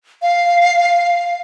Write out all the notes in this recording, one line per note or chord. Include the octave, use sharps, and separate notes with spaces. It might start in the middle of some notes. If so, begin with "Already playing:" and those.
F5